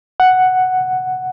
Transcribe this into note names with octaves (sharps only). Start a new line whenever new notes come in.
F#5